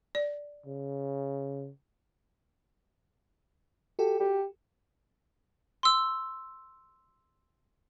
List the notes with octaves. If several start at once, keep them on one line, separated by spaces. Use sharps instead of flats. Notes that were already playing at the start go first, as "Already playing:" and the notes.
D5
C#3
F#4 G4 A4
G4
C6 E6